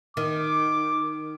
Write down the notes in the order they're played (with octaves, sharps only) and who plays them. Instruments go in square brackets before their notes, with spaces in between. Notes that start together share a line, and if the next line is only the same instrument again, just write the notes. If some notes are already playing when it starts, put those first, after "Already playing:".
[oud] D#3 [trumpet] D6